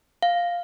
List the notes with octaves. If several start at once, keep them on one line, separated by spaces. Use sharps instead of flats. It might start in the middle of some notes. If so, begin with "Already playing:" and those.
F5